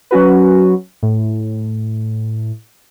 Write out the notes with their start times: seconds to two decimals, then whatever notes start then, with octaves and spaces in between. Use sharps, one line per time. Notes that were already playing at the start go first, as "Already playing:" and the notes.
0.11 F#3 C#4 F#4 B4
1.03 A2